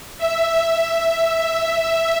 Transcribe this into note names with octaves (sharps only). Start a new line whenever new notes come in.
E5
E5